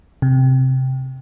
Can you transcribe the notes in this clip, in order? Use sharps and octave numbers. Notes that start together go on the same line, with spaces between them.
C3